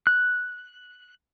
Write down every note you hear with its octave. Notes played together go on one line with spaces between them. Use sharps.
F#6